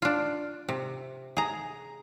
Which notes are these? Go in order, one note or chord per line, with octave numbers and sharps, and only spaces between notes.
D4 F4
C3
G#4 A#5